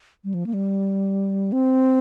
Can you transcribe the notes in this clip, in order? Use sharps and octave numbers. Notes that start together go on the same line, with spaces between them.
G3
F3
A#3
G3
C4